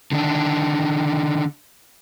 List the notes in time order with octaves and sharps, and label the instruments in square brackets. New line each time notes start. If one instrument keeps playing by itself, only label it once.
[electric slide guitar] D3 D#3 D4